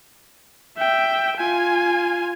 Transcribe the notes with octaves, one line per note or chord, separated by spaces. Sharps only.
E5 G5
F4 G#5